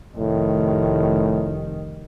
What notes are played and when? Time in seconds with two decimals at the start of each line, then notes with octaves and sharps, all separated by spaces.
0.16 F1 A2 D#3